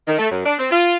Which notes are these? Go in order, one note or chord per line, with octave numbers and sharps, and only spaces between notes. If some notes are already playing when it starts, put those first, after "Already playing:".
D#3
A3
F#2
D4
C4
F4